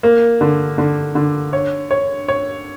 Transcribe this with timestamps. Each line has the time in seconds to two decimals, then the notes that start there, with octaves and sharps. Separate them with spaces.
0.03 A#3
0.41 D3
0.78 D3
1.15 D3
1.53 C#5
1.91 C#5
2.28 C#5